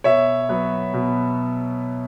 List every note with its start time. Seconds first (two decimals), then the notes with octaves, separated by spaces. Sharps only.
0.04 B2 C#5 E5
0.49 F#3 B3
0.93 B2